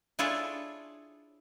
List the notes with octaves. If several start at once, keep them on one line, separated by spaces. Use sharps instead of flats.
D4 E4 F4 G#4 A4 C#5